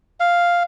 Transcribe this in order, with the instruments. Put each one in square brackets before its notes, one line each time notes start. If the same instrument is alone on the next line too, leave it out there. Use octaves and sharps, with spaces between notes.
[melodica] F5